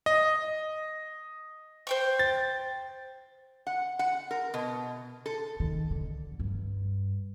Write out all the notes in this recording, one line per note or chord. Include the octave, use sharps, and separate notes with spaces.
D#5
C5 G5 C#6
A6
F#5
F#5
A#4
B2
A4
D#3
D3
G2